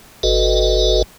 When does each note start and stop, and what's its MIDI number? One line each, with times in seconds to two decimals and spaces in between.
0.23 1.02 31
0.23 1.02 66
0.23 1.02 69
0.23 1.02 71
0.23 1.02 75